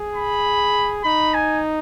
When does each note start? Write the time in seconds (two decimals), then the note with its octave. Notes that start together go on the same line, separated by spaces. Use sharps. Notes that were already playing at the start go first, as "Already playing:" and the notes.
Already playing: G#4
0.15 B5
1.04 D#4 B5
1.34 G#5